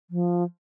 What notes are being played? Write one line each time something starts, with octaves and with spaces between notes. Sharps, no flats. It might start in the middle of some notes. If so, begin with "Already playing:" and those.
F3